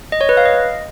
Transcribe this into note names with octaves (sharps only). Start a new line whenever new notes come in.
D#5
C#5
B4
F5
D#5